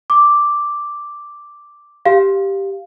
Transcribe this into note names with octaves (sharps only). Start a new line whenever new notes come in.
D6
G4 F5